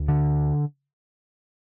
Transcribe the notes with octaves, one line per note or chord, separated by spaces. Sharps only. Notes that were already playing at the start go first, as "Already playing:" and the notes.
Already playing: D2
D3